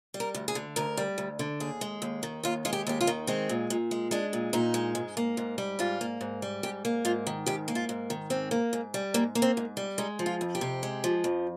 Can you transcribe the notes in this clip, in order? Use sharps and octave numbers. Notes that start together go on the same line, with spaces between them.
G3
A#4
D2
G#4
D3
D2 A#4
G3
D2
D3
D#2 G#4
G#3
D#2
D#3
D#2 F4
G#3 F4
G4
D#2 G4
F4
D#3
G#3 C4
A#2
A#2
G#3
G#3 D4
A#2
A#2 D#4
G#3
G#2
A#3
G#2
G3
G#2 F4
A#3
G#2
G3
G#2 G4
A#3
G#2 F4
D#3
G#2 G4
A#3
F4
G#2
D#3
G#2 C4
A#3
G#2
G3
G#2 A#3
A#3
C4
G#2
G3
G#3 D#4
F3
F4
F2
G4
C3
G#3
F3
F2